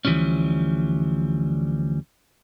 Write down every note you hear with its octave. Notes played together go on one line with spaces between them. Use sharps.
D2 E3 F3 G3 C#4